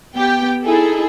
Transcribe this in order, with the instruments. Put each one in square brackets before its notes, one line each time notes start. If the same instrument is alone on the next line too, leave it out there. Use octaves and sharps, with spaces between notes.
[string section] B3 G4 G5
D#4 E4 G#4 A4